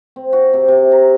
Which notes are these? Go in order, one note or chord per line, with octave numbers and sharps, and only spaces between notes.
C4
F#4
C3
C3
A#5